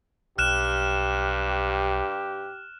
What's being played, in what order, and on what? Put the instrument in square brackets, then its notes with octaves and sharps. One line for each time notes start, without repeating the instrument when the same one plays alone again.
[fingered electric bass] B1 [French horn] G2 [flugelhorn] G4 [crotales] F6 F#6 E7